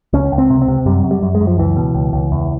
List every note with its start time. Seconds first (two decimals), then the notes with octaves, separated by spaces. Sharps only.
0.13 C#2 C#4
0.32 C#2
0.38 C4
0.50 C3
0.62 C4
0.68 C3
0.86 F#2 G3
1.04 F#2
1.11 G3
1.22 F#2
1.35 G#3
1.41 F#2
1.47 F3
1.58 C#2 E3
1.77 B2
1.95 C#2
2.13 C#2
2.32 E2